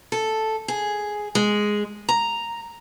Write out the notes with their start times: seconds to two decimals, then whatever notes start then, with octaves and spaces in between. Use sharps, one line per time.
0.12 A4
0.68 G#4
1.35 G#3
2.09 A#5